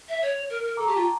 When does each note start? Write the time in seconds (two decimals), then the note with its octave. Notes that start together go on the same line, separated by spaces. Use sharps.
0.09 E5
0.22 C#5
0.50 A#4
0.64 A#4
0.77 A4 A#5 D6
0.87 G4 A5 C#6
0.96 F4 G5 A#5